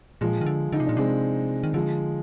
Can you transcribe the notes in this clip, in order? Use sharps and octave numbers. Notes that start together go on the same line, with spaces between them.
A#2 F3 G#3
D#3
D3
D3 D#4
C3
A#2 D4
C3 G#3 C4
D#3
D3 F3 G#3